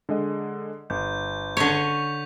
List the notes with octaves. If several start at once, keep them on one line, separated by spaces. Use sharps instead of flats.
D3 G#3 D#5
G1 G6
D3 C#5 C#6 B6 F7